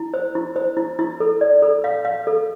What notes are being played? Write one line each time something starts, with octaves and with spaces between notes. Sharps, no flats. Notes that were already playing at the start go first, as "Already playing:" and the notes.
Already playing: E4
C5
E4
C5
E4
E4
A4
D5
A4
F5
F5
A4